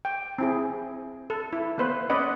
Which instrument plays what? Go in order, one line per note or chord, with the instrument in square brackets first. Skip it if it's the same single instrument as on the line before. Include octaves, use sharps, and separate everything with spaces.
[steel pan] G5
C4 E4 G#4
A4
E4
A#3 B3 B4 C5
C#4 B4 D5 D#5 F#5